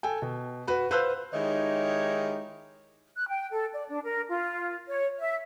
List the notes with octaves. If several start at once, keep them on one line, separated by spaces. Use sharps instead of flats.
A4 G5 G#5
B2
F#4 B4 B5
B4 C5 F5 E6 F#6 G6
D#3 G#3 D#4 E4 G4 C#5
F#6
G5
A4
D5
D4
A#4
F4
C#5
E5